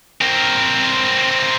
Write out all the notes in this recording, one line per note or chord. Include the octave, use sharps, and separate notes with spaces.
C4 A#4